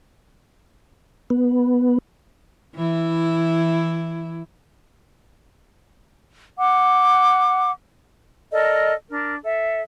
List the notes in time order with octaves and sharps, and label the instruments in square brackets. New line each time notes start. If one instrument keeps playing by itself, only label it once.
[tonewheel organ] B3
[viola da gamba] E3 E4
[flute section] F#5 D6
A4 A#4 D5 D#5
D4 A#4
A4 E5